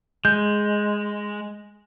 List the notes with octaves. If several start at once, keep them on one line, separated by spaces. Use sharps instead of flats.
G#3 G6